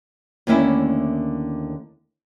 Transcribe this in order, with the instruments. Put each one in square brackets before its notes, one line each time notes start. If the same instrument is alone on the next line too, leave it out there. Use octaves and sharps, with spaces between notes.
[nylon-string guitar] D#2 D3 A3 A#3 C#4 E4